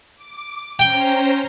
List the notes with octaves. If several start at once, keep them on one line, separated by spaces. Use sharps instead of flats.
D6
C#4 C5 G5 A#5